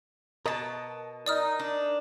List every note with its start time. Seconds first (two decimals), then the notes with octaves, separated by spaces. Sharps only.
0.46 B2 A#4 D#5 A5
1.26 D#4 D5 D#6 F6
1.60 D4